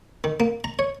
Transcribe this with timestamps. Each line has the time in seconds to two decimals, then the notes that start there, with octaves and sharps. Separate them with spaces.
0.24 D#3
0.40 A#3
0.64 A#5
0.79 C#5